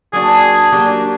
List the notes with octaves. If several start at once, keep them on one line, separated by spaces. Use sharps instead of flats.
F#3 A#3 D4 F#4 G#4
F#3 A#3 D4 G4